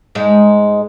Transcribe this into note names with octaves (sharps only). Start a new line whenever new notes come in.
G#2 G#3